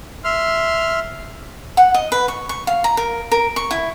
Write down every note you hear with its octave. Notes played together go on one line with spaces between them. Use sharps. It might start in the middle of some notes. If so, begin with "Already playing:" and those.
E5 C6 F6
F#5
D#5
B4
C#6
C#6
F5
A#5
A#4
A#4
C#6
E4